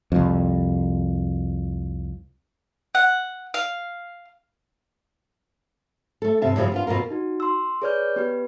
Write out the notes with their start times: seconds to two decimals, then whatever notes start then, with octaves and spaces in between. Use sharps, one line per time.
0.12 C2 F2
2.95 F#5
3.54 F5
6.22 A3 A4
6.42 G2 C3 E5 A5
6.56 F#2 A#2 C#3 F3 G3
6.72 B3 D4 F4
6.87 F2 B2 A#3 F4 A#4
7.10 D#4 F#4
7.40 C6 E6
7.82 G#4 B4 C#5 D5 F6 G6
8.16 B3 G4 B4